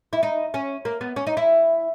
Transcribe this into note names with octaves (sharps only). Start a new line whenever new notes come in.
E4
D#4
C#4
A#3
B3
C#4
D#4
E4